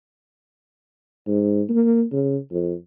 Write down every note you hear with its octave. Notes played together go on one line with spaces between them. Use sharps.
G#2
A#3
C#3
F2